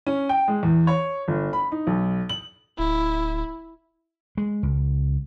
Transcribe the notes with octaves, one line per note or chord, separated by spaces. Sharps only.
C#4
G5
G#3
E2
C#5
G1
B5
D#4
B1
F#7
D1 E4
G#3
C#2